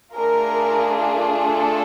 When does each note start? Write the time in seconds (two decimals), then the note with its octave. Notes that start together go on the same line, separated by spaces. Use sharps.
0.15 A3 D4 F4 G#4 A#4
1.48 A4